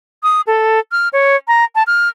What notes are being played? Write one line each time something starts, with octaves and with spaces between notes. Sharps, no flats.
D#6
A4
F6
C#5
A#5
A5
F6